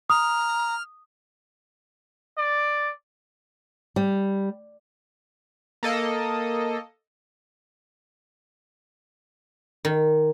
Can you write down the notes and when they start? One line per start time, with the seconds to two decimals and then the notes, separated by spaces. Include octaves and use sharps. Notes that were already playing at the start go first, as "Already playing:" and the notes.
0.10 A#5 D#6 F6
2.38 D5
3.96 G3
5.83 A#3 A4 D#5
9.85 D#3